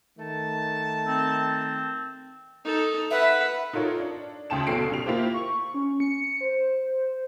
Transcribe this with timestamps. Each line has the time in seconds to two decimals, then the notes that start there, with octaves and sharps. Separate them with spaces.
0.18 D#3 A3 A5
1.07 C4
2.65 D#4 A4
3.11 B4 E5 F#5
3.73 D#4 F4 A4 A#4 C#5
4.00 D4
4.50 D2 C#3 G5 A5 E7
4.67 G1 B2 C#4 A4 C7 D7
4.92 G3 F7
5.06 A#3 E4 F4 G4 C5
5.34 C#6
5.74 C#4
6.00 C#7
6.41 C5